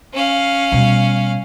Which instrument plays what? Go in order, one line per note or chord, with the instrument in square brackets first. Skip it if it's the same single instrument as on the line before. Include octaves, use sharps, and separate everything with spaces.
[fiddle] C#4 F5
[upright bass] B2 G3